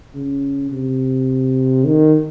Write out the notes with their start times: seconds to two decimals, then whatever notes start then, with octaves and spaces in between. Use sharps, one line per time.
0.15 C#3
0.71 C3
1.85 D#3